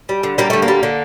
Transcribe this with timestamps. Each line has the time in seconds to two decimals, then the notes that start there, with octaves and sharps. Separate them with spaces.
0.09 G3
0.23 D3
0.38 G3 A#3
0.50 D3 A3
0.62 A#3
0.68 G3
0.83 D3